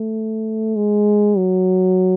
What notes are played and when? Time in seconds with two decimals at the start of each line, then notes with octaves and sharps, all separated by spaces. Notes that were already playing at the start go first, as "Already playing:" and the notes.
Already playing: A3
0.76 G#3
1.37 F#3